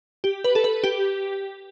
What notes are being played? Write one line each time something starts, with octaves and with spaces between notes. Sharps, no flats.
G4
B4
A4
B4
G4